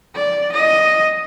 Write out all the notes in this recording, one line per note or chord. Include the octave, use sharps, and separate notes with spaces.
D5
D#5